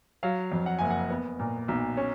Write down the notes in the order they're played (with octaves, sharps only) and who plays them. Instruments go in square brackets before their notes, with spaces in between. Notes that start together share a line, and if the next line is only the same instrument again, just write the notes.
[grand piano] F#3 F5
F2
F#5
F#1 G#5
F#5
B3
A#2
B1
C#4